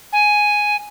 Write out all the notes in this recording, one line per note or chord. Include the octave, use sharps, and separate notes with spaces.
G#5